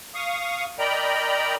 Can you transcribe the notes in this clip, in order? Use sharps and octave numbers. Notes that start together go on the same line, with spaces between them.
F5 C#6 D#6
A#4 D5 D#5 G5 A#5 B5